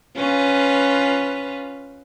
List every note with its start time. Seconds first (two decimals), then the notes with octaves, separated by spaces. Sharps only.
0.17 C#4 F4 B4